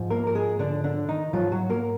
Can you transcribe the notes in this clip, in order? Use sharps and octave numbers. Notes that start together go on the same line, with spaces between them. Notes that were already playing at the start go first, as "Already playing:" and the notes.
Already playing: G#2 F3
A#3 A#4
A#4
G#3 G#4
D3 D4
D3 D4
D#3 D#4
G#2 F3 F#3 F4
F#3 F#4
A#3 A#4